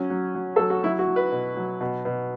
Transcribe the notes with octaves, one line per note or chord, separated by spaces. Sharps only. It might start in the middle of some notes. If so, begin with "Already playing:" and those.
Already playing: F#3 C#4
F#3
F#3
F#3 A4
F#4
F#3 E4
F#4
F#3
B4
B2
F#3
B2
B2